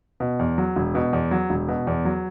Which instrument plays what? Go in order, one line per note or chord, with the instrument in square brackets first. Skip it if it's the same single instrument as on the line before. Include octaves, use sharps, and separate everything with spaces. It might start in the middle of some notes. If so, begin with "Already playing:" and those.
[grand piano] B2
E2
F#3
E1
B2
E2
F#3
E1
B2
E2
F#3